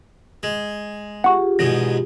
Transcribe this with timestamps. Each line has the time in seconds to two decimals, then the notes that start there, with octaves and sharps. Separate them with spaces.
0.43 G#3
1.24 F4 G4 G#4 F#5 C#6
1.59 E2 G#2 B2 A#6